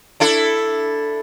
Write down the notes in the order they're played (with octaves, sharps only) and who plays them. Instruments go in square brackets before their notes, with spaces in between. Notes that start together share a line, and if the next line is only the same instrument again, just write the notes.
[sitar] D4 E4 A4